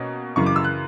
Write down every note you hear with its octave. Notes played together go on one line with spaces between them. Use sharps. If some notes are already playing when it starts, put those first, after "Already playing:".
Already playing: B2 A#3 C#4
F#2 C#3 E3 C#6
D6
E6
F#6